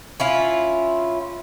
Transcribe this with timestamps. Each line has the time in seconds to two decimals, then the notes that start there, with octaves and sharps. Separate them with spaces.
0.20 C#4 E4 F4